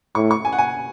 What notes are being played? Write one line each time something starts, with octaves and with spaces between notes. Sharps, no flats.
A2 C#6
C#6
G#5
F#5
G#5